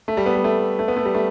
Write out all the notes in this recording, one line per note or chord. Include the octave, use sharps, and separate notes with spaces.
A3
G3
B3
G3
A3
A3
B3
A3
G3
A3